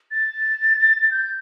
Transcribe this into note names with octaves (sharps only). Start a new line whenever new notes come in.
A6
G6